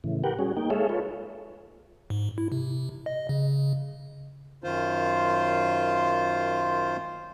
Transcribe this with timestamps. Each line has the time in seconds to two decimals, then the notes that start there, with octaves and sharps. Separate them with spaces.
0.04 A2 C#3 E3
0.24 G4 A#4 B4 F#5 G5
0.39 G3 C#4 F#4 G#4
0.57 A#3 D#4 G5
0.70 G#3 G#4 A4 C#5 E5 F5
0.89 F4 A4 B4 C#5
2.10 G#2
2.38 E4
2.52 C3
3.06 D#5
3.29 C#3
4.64 F#2 D#3 F4 C5